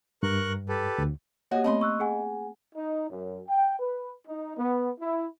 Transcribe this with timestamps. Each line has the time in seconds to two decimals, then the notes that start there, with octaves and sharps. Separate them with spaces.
0.23 G2 A#4 C#6 F#6
0.69 G4 A4 B4
0.98 D2
1.51 A#3 F#4 G4 C#5 D#5 G#5
1.64 A3 B3 C4 D#5 B5 C6
1.81 C#6 E6 F#6
2.00 G#4 F#5 G#5
2.75 D#4
3.09 F#2
3.48 G5
3.79 B4
4.28 D#4
4.57 B3
5.01 E4